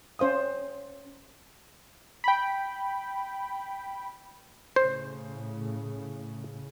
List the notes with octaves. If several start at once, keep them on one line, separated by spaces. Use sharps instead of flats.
C#4 C5 F5 D#6
G5 B5
A2 C#3 C5